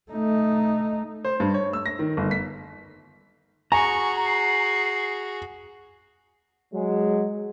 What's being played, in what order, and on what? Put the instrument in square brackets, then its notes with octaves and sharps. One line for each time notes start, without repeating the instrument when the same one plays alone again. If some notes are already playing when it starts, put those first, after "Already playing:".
[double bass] A3 D#4
[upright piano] C5
G2
C#5
E6
A#6
D#3
G1
B6
[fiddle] F#4 G#4 [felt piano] G#5 [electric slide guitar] A#5 [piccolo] C#6
[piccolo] C7
[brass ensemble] F#3 G#3